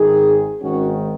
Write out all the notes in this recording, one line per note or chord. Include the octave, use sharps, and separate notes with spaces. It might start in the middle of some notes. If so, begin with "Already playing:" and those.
Already playing: G#1 G#2 D#3 D#4 G#4
G#1 G#2 D#3 C#4 F#4